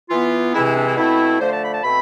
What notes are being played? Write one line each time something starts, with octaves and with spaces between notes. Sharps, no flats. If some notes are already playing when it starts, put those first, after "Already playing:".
E3 B3 F4
C3 E3 G#3 C4 E4
E4
D4
E4
B2 A3 C4 E4
D3 F3 A3 C5
A5
B5
A5
B2 A3 C4 B5